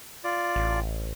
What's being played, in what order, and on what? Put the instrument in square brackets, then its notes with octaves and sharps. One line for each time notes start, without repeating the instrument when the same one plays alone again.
[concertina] F4 D5
[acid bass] A1